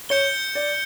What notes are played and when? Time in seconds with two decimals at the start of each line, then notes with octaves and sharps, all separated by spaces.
0.09 C#5 G6 C#7 G7
0.55 D5